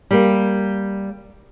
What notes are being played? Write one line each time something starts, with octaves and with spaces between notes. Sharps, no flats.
G3 A#3